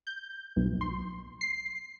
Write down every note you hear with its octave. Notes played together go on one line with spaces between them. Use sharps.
G6
B1
C6
C7